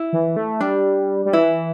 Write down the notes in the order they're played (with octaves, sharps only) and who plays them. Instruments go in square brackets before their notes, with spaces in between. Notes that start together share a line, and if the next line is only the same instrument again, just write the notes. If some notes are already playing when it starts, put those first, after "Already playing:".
Already playing: [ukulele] E4
[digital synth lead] E3
A3
[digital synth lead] G3 [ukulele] D4
[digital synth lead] G3
[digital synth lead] E3 [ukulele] E4